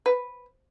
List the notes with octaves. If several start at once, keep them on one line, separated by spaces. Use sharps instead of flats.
B4